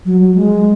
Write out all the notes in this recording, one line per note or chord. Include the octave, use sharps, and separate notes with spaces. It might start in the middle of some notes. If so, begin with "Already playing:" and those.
F#3
F#3
G#3